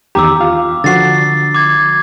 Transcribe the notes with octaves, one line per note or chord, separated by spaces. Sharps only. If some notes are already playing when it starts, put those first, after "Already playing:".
E2 D#3 G4 A#5 D6 E6
F4 F5
D3 F3 F#4 A6 C7
D6 G#6